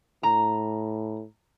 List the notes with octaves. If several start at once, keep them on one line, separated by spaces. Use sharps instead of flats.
A2 A#5